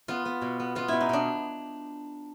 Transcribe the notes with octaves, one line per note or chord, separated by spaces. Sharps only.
B3 F4
B3
B2
B3
B3 F4
B2 E4
D#4
B2 D4